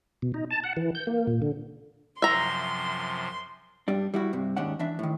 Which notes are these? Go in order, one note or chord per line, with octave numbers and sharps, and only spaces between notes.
B2
D#4
A5
F#5
E3
G6
A#3
A#2
D3
F#2 C3 F3 E5 A#5 C6
G2 G3 D4
G3 E4 F#4
G2 C3
D#2 G#2 C#4 D4 F#5
E3 D4 E5
A2 D#3